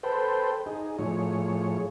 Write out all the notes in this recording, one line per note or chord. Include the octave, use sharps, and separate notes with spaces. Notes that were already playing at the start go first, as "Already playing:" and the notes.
A4 B4 C5 G5
D#4 G#4
A2 F3 G#4 C#5